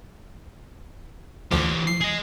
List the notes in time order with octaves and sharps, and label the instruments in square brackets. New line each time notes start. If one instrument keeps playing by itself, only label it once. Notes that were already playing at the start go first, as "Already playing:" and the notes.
[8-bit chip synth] D2 F3 [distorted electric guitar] E3 G4
[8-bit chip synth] C7
[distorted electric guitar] G#4 D#5